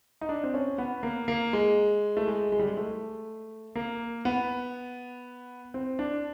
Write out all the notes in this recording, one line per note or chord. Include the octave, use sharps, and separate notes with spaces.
D#4
D4
C4
C#4
B3
A#3
A#3
G#3
A3
G#3
G#3
G3
G#3
A3
A#3
B3
C4
D4